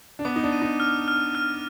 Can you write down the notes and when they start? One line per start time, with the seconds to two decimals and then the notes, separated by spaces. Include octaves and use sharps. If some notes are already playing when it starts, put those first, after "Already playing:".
0.19 D4
0.25 B3 D6
0.36 D#4
0.43 D4
0.52 D#7
0.62 D#4
0.80 F6
1.08 F6
1.35 F6